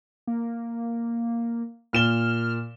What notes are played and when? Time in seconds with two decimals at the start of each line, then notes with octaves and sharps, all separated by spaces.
0.27 A#3
1.93 A#2 F6 E7 G7